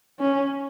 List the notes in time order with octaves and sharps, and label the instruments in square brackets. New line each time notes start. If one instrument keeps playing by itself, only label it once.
[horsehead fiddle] C#4